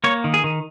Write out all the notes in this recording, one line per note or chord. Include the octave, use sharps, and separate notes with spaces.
A#3 C#5
D#3
G#4
D#3